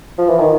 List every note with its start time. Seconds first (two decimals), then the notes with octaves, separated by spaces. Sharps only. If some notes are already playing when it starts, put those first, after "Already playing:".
0.19 F3
0.30 E3
0.40 D#3